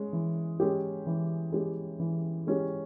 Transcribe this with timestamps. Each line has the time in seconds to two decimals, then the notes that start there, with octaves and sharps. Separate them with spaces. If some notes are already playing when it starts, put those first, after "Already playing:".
Already playing: G#3 C#4
0.13 E3
0.60 G#3 C#4 G4
1.07 E3
1.53 G#3 C#4 G4
2.00 E3
2.47 G#3 C#4 G4